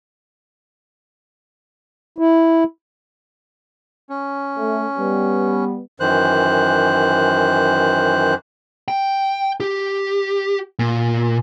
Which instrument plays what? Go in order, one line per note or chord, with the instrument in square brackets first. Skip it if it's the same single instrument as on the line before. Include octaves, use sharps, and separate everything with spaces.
[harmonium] E4
[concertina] C#4
[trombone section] A3
G3 B3
[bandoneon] F#2 D#3 E3 C5 F#6
[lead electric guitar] G5
G4
A#2